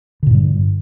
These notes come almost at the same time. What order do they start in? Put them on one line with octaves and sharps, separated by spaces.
D3 A#2 G2 G3